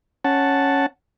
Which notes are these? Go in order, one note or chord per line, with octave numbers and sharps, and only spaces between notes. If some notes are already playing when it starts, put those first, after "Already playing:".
C#4 F#5 A5